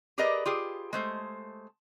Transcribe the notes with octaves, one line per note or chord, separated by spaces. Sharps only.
G4 G#4 A#4 B4 D5 D#5
F4 G4 G#4
G#3 A3 C5